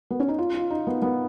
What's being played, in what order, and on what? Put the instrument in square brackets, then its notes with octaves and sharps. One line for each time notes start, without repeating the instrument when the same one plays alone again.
[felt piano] B3
C#4
D#4
F4
F4
D#4
B3
B3